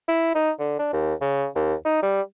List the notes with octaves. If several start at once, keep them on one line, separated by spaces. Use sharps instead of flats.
E4
D#4
D3
D4
D#2
C#3
D#2
D#4
G3